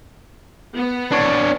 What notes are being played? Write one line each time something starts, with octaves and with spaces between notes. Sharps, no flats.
B3
D4 C#5